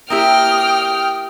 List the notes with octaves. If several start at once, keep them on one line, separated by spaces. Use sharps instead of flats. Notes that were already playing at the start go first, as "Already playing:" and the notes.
A#3 E4 G4 G5 D#6 F6